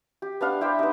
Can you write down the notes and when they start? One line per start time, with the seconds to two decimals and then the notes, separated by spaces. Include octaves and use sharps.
0.22 G4
0.41 B3 D4 F5
0.61 E4 G4 C5 G5
0.79 B3 D#4